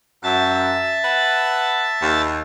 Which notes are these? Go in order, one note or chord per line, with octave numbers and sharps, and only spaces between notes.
F#2 E5 A5 A6
B4 F#5
D#2